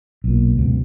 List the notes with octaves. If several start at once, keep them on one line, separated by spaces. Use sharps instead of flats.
B1 A#2
C#2 F#2 B2